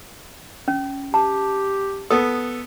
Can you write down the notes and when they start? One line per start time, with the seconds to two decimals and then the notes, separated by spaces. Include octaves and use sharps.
0.68 C#4
1.14 G4 A5
2.10 B3 A4 D#6